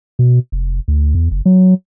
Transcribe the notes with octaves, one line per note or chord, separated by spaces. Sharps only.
B2
F1
D2
E2
F#1
F#3